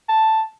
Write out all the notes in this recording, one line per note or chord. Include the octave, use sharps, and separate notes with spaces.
A5